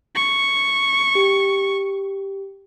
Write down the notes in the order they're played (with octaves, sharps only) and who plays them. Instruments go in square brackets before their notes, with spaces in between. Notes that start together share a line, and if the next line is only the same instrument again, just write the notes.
[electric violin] C#6
[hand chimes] G4